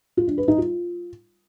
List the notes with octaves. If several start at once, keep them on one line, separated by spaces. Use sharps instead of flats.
F4
D4
B4
D#4
F4